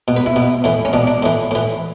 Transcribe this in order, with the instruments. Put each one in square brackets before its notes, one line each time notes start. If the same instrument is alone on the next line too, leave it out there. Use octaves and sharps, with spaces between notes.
[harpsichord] B2
B4
E4
B2
A2 E3
C#4
B2 D4
D4
A2 E3
A2 E3